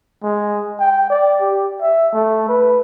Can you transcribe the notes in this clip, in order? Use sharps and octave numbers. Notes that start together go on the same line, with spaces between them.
G#3
G5
D5
G4
E5
A3
B4